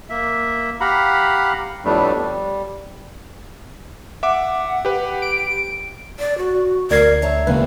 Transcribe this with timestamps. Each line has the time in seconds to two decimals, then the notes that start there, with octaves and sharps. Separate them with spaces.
0.09 A#3 E5
0.80 G4 F5 F#5 A#5 B5
1.85 F2 A2 G3 A3 B3 D4
2.19 G3
4.23 E5 F#5 D6
4.85 G4 B4
5.22 D7
6.19 D5
6.38 F#4
6.91 D2 A#4 D5 G#6 C7
7.22 C#5 E5 A5 A#5
7.47 E1 C#3 A#3 B4 F5